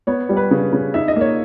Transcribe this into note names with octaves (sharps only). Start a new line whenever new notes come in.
B3 C#5
G3
B4
C#3
C#3
D#4 E5
D#5
A#3 C#5